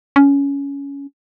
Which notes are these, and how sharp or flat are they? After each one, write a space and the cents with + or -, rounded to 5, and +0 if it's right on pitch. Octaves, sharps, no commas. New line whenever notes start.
C#4 +15